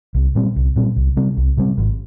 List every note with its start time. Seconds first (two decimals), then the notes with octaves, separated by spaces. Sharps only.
0.15 C2
0.35 A#2 G3 C4
0.56 C2
0.76 A#2 G3 C4
0.96 C2
1.17 C3 G3 C4
1.37 C2
1.57 C3 G3 C4
1.78 G#1